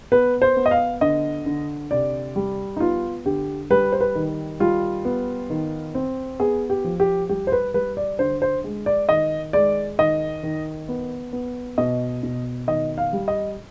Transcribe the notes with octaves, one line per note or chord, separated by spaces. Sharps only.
B3 B4
C5
B3
D#5
F5
D3 D#5
D3
C3 D5
G3
D#4
B3 F4
D3 G4
G3 B4
C5
B4
D#3
G3 F4
B3
D#3
C4
B3 G#4
G4
F3
G4
G3 G4
C5
B4
G3 B4
D5
D3 C5
C5
G#3
D5
D#3 D#5
G#3 D5
D#3 D#5
D#3
B3
B3
B2 D#5
B2
D#3 D#5
F5
G3
D#5